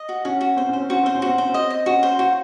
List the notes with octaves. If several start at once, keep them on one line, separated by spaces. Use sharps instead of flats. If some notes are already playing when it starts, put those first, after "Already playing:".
Already playing: D#5
F#4
C#4 F#4
F#4
C4 C5
C#4 C5
C4
C#4 F#4
C4 C5
C#4
C4 F#4
C#4 C5
C4 D#5
D#5
C#4 F#4
C5
F4 F#4